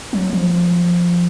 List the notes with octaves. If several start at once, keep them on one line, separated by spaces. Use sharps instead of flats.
F#3
F3